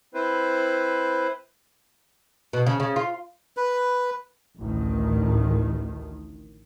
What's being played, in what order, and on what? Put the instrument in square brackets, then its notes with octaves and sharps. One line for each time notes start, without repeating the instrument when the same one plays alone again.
[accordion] C4 E4 B4 C5
[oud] B2
C#3
C#3
F4
[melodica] B4
[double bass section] A1 D2 A2 D#3